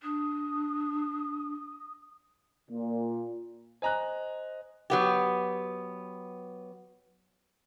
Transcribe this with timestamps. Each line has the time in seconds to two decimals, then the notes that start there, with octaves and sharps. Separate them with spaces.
0.03 D4 D#6
2.71 A#2
3.82 C5 D#5 G#5 A#5 F#6
4.90 F#3 B3 G4